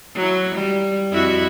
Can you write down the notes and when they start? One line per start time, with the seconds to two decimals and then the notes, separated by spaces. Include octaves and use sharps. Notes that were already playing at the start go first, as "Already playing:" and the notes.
0.16 F#3 E4
0.55 G3
1.11 F2 E4 F#4